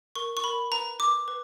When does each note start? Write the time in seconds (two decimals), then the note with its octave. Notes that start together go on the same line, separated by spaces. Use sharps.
0.16 A#4 C#6
0.37 C#6
0.44 A#4 B5
0.72 B4 A#5
0.99 B4 D6
1.28 B4